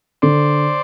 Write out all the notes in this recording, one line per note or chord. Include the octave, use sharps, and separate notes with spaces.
D3 C5 D5